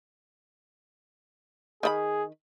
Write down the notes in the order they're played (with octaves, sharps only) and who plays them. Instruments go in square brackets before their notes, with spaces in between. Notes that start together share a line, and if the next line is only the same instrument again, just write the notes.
[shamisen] D#3 E4 B5 [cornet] G#4